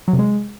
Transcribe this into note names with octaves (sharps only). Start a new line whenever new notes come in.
F#3
C3
G#3